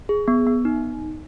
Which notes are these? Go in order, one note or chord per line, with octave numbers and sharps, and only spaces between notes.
G#4
B3
B3
D#4